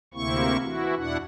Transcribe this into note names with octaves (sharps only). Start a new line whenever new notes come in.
D2 C3 A#3 C4 E4 C#6
E3 E4 F#4
E2 B2 D4 E4 F#5